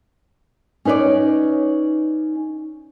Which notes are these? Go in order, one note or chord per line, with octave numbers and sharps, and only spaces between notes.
C#4 D#4 B4 C#5 D5